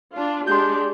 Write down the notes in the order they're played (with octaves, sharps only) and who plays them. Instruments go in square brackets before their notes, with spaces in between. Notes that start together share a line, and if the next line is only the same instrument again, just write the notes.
[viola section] D4 F4
[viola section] G#3 D4 G4 [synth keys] C6 G6